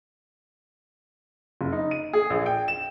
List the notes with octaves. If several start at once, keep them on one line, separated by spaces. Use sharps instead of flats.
F#1
D#4
D#7
G#4
A#1
G5
E7